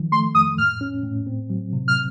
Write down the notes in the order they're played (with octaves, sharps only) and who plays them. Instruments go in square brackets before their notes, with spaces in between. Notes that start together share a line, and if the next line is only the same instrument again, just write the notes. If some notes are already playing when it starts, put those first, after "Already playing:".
Already playing: [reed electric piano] D#3 F3
[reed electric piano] A3 [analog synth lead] C6
[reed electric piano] F2 [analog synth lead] D#6
[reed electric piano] A2 [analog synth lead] F6
[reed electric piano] C#4
A2
C4
F#3
C3
[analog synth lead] F6